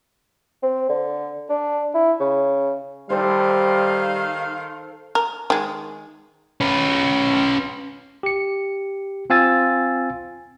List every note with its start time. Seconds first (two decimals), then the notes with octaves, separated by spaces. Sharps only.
0.63 C4
0.89 D3
1.50 D4
1.95 E4
2.20 C#3
3.10 D#3 G3 A4 C5 F5
5.15 A#4
5.50 D#3 G#3
6.61 C#4 B4
8.23 G4 C#7
9.30 C4 F4 F5 G#5 E6 A6